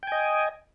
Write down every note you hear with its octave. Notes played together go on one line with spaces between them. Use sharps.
D#5 G5 G#5